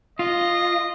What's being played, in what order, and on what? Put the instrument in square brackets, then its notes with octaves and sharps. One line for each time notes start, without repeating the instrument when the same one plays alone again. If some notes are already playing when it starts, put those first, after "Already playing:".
[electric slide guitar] F4 [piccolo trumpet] D#5